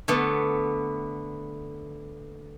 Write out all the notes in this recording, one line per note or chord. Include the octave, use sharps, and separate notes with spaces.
D3 A3 B3